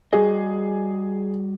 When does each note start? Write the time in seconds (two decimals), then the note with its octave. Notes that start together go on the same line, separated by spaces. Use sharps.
0.13 G3 F#4 G#4 D#5